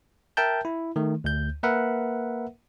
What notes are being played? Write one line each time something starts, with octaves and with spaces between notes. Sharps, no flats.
A#4 E5 G5 A5 G6
E4
D#3 A3
D2 G6
A#3 A#4 B4 E5 F#5